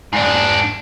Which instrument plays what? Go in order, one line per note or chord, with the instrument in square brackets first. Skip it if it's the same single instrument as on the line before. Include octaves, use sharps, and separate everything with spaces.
[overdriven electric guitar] G#2 D4